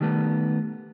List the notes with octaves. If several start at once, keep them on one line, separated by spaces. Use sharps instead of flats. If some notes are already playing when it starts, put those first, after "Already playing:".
D#3 G3 A3 B3